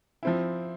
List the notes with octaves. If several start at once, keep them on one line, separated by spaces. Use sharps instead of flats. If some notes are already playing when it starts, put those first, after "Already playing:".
F3 C4 E4